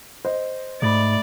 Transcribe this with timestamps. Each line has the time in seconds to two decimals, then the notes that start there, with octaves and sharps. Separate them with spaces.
0.25 C5 D#5
0.82 G#2 A3 D5 B5